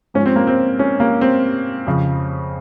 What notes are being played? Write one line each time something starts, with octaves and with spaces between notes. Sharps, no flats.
G#2 F3 C#4
C4
A#3
C4
C#4
A#3
C4
F2 C#3 F3